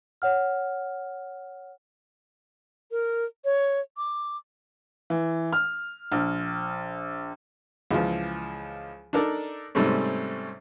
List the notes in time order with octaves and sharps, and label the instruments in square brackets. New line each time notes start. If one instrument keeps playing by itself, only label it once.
[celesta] C#5 F#5 F6
[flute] A#4
C#5
D6
[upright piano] E3
F6
A#1
[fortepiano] C#2 E3 F3
D4 D#4 A4 A#4 D5
G#2 C3 G3 A3 C4 C#4